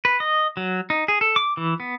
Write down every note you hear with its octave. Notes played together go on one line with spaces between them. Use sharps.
B4
D#5
F#3
D#4
G#4
A4
D6
E3
B3